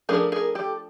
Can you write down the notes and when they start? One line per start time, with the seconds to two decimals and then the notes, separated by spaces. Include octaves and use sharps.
0.09 F3 A3 D4 G#4 A#4
0.32 G#4 A#4
0.55 G4 A4